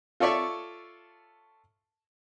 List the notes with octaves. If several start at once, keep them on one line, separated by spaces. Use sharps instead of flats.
F4 A4 C#5 D5 E5 C#6